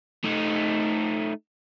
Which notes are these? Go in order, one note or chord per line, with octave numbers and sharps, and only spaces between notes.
A3 D#4